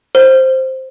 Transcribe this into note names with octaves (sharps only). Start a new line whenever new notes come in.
C5